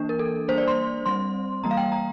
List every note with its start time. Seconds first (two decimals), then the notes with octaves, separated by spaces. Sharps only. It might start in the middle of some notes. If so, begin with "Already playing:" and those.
Already playing: E3 A#3 D4
0.09 A#4
0.19 A4
0.48 G3 A#3 D4 C5
0.58 D5
0.68 C6
1.06 G3 C4 C6
1.64 E3 G3 A#3 A#5
1.71 F5
1.77 G5
1.92 A#5